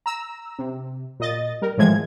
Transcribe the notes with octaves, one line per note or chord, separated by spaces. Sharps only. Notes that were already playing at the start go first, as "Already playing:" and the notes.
A#5 E6
C3
A#2 D#5 A6
G3 A#4
A2 E3 F3 G#3 G#6